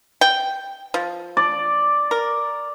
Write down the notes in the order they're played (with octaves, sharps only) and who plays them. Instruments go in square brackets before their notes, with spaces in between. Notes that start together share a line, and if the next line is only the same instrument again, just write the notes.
[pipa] G5
F3
[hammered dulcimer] D5
[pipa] A#4